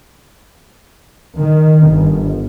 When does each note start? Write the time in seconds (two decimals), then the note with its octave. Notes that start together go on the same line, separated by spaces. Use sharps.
1.37 D#3
1.88 G1